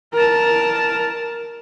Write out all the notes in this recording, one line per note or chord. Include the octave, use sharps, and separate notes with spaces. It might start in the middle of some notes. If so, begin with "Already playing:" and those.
A#4 A5